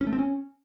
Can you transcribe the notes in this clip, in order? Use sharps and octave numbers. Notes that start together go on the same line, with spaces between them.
C#4
A3
C4
C#4